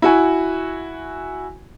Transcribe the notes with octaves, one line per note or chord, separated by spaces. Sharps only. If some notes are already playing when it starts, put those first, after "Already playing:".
E4 F#4 G#5